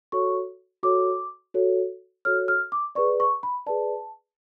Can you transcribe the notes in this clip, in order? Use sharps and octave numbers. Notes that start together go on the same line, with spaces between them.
F#4 A4 C#5 C#6
F#4 A4 C#5 D6
F#4 A4 C#5
F#4 A4 C#5 F6
F6
D6
G#4 B4 D5 C#6
C#6
B5
G#4 B4 D5 A5